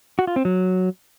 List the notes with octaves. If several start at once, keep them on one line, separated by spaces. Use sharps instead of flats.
F#4
F4
C4
F#3